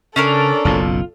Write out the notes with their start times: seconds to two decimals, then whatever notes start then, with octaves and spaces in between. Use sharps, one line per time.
0.16 C#3 C#4 D4 A4 A#4 D5
0.65 F#1 B1 B2 F4